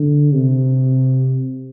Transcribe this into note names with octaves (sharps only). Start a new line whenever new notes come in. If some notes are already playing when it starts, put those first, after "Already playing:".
Already playing: D3
C3